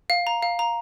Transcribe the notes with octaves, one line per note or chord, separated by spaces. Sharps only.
F5
A#5
F5
A#5